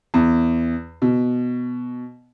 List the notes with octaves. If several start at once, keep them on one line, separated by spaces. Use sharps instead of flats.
E2
B2